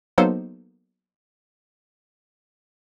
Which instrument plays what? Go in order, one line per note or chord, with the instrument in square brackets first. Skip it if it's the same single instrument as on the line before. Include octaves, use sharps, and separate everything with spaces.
[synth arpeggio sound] F#3 A#3 B3 D#4 A4 C5